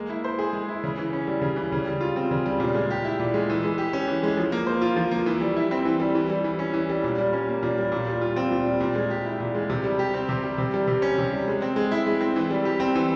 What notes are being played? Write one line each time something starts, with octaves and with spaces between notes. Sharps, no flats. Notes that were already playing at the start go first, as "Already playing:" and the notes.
Already playing: G#3 A#3
E4
C5
G#4
G#3
E4
C#3
E3
C#4
G3
C#3
E3
C#3
G3
F4
C4
C#3
G3
A#2
G#3
G4
E4
A#2
G#3
E3
G#3
G4
C#4
E3
G#3
F3
A#3
C5
F4
F3
A#3
E3
G3
E4
C4
E3
G3
E3
G3
E3
C#4
E3
G3
A#2
G3
C#4
A#3
A#2
G3
A#2
G3
F4
C4
A#2
G3
A#2
G#3
G4
E4
A#2
G#3
C3
G3
G4
C4
C3
G3
C3
G3
C3
C#4
C3
G3
G#3
C4
G#3
E4
G#3
C4
E3
G3
G4
C4
E3